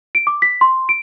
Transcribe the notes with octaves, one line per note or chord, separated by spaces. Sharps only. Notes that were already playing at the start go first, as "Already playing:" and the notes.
D7
D6
B6
C6
D7